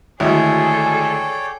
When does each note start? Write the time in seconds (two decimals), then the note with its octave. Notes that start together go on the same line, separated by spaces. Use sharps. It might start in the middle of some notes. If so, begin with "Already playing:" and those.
0.20 G#1 D2 E4 G#4 A4 C#5 D5 G5